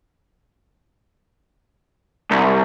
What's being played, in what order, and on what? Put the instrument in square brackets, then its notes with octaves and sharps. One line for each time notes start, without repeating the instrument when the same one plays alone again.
[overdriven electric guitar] C2